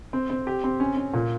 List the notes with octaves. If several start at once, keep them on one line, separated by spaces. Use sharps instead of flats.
C4
C4
G4
C4
C#4
C#4
A#2